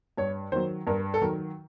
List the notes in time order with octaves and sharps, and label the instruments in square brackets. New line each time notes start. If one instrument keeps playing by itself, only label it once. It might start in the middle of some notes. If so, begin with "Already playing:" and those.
[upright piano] G2 C#5
D#3 F#3 C5
G2 A#4
A4
D#3 F#3 A#4